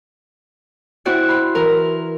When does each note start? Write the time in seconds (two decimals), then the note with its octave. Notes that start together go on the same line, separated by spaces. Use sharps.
1.05 C4 E4 F#4 D5 C#6 F#6
1.28 B5 C6
1.55 E3 A#4